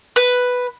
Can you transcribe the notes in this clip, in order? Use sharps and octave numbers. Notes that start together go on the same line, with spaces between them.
B4